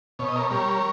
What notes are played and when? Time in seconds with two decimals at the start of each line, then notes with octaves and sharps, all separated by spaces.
0.19 B2 C#5
0.28 D#5
0.36 A#4 C#5
0.51 G3 A#4 C#5